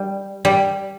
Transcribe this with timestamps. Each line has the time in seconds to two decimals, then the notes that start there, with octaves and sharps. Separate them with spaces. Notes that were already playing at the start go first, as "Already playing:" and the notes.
Already playing: G3
0.45 G3